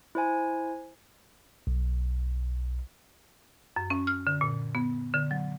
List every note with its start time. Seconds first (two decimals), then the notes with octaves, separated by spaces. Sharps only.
0.15 E4 C5 G#5
1.67 B1
3.76 F#2
3.90 C#4
4.07 F6
4.27 D3
4.41 A#2
4.75 B3
5.14 D3
5.31 F#3